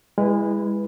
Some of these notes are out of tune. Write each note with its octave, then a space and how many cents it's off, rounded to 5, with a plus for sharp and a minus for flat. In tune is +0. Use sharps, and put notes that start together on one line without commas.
G#3 -25 E4 +0 B4 +0